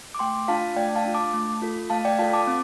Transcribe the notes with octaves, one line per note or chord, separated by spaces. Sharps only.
D6
A3 G5 C6
D4 F4 F5 A5
A3 D5 G5
F5 A5
D4 F4
A5 D6
A3
F4 A4
A3 F5 A5
D5 G5
F4 A4 F5 A5
A5 D6
C4